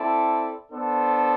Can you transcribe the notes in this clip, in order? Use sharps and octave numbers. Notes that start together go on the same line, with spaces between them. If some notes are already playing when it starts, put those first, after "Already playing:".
Already playing: C4 E4 A4 D5
B3 D4 A4 C5